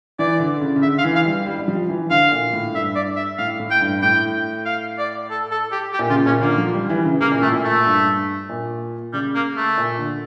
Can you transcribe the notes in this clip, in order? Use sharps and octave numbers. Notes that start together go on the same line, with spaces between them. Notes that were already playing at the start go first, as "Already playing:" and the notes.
E3 D5
D3
C#3
C#3
D3 E5
F5
E3
F5
G3
G3
G3
F3
E3
D3 F5
A#2
A2
G2 E5
D5
E5
A2 F5
A2
G5
G2
A2 G5
F5
D5
A4
A4
G4
G4
A#2
C#3 F4
A#2 C#4
D3 A#3
F3
G3
E3
C#3
C#3 A#3
A#2
A2 A3
A#2
A3
G2
A#2
C#3 G3
A#3
A3
A#2
D3